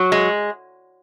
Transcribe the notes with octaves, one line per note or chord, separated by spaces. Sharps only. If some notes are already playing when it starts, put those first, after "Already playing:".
Already playing: F#3
G#3